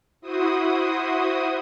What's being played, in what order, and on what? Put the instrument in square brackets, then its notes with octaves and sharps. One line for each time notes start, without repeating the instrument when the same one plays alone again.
[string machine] E4 F#4 C5 D#6